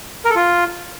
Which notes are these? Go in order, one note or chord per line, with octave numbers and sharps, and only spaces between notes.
A#4
A4
F4